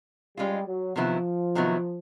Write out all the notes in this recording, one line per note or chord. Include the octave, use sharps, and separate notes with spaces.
G3 G#3 C#4 F4
F#3
C3 D#3 F3 F#3 B3 E4
C3 D#3 F#3 B3 E4